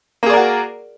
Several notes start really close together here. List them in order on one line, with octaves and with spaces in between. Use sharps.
A#3 G#4 D5 A#4 F#4